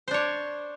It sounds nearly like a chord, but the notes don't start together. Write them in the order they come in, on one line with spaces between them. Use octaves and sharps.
C5 D4 C#5